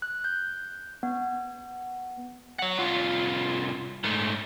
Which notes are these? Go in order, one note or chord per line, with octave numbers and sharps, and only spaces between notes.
F#6
G6
B3
C#5 F#5
C2 F4
G#2 A3